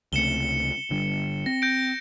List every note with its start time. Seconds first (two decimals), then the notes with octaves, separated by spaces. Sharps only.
0.13 C#2 C3 A3 C#7 E7 G7
0.90 G1 D3 G3
1.46 C4 A#6
1.62 G6 A#6 D7